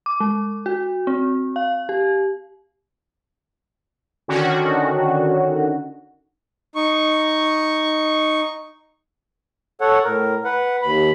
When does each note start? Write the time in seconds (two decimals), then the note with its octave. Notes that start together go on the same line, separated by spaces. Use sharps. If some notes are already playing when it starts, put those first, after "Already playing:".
0.06 D6
0.20 G#3
0.66 F#4
1.07 C4
1.56 F5
1.89 G4
4.28 D3 D#3 C#4 F#4
6.75 D#4 C#6
9.81 A4 C#5 F#5
10.05 A2 A#4
10.44 B4 F#5
10.83 D#2 B5